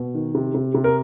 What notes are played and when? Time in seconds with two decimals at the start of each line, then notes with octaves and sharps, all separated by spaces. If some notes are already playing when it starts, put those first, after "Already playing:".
Already playing: B2
0.14 D#3
0.35 C3
0.54 C3
0.74 C3
0.84 A#4